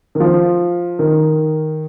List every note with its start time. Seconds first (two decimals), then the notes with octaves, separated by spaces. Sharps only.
0.15 D#3
0.20 F3
0.99 D#3